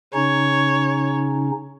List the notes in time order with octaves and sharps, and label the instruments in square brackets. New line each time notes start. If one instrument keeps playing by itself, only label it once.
[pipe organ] C#3 C#4 D#4 [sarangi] C#5